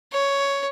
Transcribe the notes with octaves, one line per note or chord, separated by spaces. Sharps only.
C#5